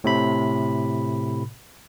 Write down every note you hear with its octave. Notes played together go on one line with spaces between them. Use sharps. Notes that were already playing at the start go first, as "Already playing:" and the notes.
A2 C3 B5